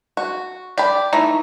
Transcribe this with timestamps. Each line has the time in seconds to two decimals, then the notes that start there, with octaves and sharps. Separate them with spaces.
0.17 F#4
0.78 G4 D5 B5
1.13 E3 A3 D#4